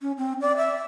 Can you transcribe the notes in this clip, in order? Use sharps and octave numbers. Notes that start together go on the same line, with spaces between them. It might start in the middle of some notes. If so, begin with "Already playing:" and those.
C#4
C4
D5
E5